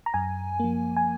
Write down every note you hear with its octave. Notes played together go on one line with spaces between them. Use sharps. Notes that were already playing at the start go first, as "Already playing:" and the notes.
A#5
F#2 G#5
F3 A#3
G#5